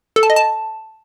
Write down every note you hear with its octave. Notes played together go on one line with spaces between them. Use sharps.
A4
A5
D#5
A5